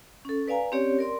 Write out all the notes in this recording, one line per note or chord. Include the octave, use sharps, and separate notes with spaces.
C#4 A4
B4 D5 F5 G#5 A#5
C4 C#4 G4 C#5 D5
A#4 D5 C6